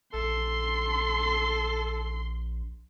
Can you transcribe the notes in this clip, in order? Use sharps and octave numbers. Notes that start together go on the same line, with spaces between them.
A#1 A4 C6